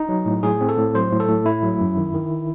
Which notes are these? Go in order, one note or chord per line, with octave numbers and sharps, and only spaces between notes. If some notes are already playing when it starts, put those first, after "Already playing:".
Already playing: D#4
F#3
A2
A2 G#4
C4
A4
A2
F#3 C5
A2
A4
A2
A3 E4
F#3
F#2
D#3
D#3